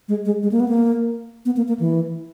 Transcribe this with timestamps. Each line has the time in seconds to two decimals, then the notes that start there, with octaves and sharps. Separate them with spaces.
0.08 G#3
0.25 G#3
0.43 G#3
0.52 A#3
0.60 B3
0.68 A#3
1.45 B3
1.57 A#3
1.68 A#3
1.80 E3